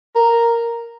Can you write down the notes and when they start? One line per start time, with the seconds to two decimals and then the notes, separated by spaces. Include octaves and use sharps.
0.16 A#4